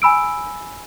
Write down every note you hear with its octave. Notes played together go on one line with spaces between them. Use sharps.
G#5 B5 E6 D7